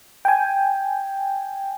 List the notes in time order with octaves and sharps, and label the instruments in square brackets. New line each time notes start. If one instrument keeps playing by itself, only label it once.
[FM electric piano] G5 G#5